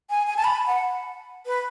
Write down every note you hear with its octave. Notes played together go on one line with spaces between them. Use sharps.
G#5
G#5
A5
B5
F#5
B4